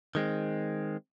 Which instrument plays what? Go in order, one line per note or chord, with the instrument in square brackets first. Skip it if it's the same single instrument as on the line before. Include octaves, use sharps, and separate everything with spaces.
[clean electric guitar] D#3 G#3 C4